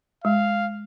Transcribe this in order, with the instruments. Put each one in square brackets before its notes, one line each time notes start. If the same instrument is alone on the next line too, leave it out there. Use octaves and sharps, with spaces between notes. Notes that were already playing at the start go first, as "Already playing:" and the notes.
[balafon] G#3 [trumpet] F5